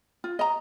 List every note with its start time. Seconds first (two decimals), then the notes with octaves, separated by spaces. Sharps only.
0.24 F4
0.39 D#5 A#5